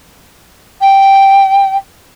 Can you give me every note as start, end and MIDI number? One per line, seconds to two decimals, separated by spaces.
0.81 1.76 79